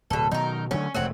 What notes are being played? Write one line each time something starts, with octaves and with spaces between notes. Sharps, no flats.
D1 B2 A4
B2 D#3 F#3 D#4 A#4
D3 F#3 A3 C#4
E1 B1 F#3 A3 C4 F#4